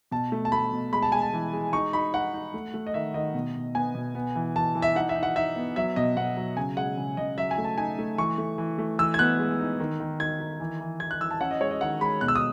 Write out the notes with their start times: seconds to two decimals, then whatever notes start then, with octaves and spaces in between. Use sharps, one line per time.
0.11 B2 A5
0.32 A3
0.45 A5
0.52 A3 B5
0.73 B2
0.93 G#3 B5
1.02 A5
1.12 G#3 G#5
1.22 A5
1.33 E3
1.53 G#3
1.73 D#4 C#6
1.93 D#4 B5
2.13 D#4 F#5
2.34 D#4
2.54 A3
2.74 A3
2.87 D#5
2.94 D#3 E5
3.14 D#3 D#5
3.34 B2
3.55 B2
3.75 B3 G#5
3.95 B2
4.15 B3
4.35 E3
4.56 E3 A5
4.75 E3
4.82 E5
4.95 D#4 F#5
5.09 E5
5.16 D#4
5.23 F#5
5.36 D#4 E5
5.56 B3
5.76 F#3 E5
5.96 B2 D#5
6.17 B2 F#5
6.37 F#3
6.57 C#3 G#5
6.77 G#3 F#5
6.97 C#3
7.17 C#3 D#5
7.37 F#3 E5
7.51 G#5
7.58 A3
7.64 A5
7.78 D#4 G#5
7.99 A3
8.18 E3 C#6
8.38 A3
8.58 E3
8.78 A3
8.99 E3 E6
9.14 G#6
9.19 B3 F#6
9.39 G#3
9.59 D#4
9.80 D#3
10.00 D#3
10.20 D#3 G#6
10.40 D#3
10.60 E3
10.80 E3
11.00 E3 G#6
11.11 F#6
11.21 E3 E6
11.31 A5
11.41 C#4 F#5
11.51 D#5
11.61 G#3 C#5
11.71 D#5
11.81 D#3 F#5
12.01 G#3 B5
12.21 B2 F#6
12.28 E6
12.35 D#6